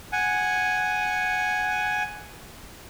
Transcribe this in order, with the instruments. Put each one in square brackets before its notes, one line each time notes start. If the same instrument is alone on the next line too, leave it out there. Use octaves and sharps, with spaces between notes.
[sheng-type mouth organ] F#5 G#5